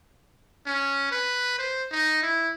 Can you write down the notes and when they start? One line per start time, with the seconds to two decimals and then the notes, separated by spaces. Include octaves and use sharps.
0.67 C#4
1.11 B4
1.59 C5
1.91 D#4
2.23 E4